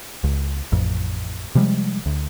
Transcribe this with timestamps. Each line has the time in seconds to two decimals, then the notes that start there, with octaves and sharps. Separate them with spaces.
0.24 C#2
0.72 A1 F2
1.55 C3 F3 G3 G#3
2.06 D2